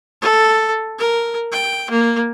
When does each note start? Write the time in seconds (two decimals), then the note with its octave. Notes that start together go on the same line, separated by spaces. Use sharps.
0.21 A4
0.99 A#4
1.52 G5
1.90 A#3